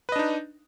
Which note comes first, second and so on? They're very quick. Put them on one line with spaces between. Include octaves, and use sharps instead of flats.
B4 D#5 D4 D#4